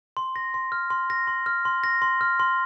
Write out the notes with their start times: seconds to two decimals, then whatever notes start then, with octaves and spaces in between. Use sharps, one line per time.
0.17 C6
0.36 A#6
0.54 C6
0.72 F6
0.90 C6
1.10 A#6
1.27 C6
1.46 F6
1.65 C6
1.84 A#6
2.02 C6
2.21 F6
2.40 C6